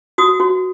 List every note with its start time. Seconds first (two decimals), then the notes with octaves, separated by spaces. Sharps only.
0.18 F#4 D#6
0.40 F#4